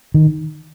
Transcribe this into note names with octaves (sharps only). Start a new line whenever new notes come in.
D#3